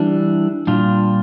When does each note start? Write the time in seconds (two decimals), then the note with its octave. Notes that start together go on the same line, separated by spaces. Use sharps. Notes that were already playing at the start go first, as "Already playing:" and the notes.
Already playing: E3 G3 D4
0.67 A#2 G3 D4 F4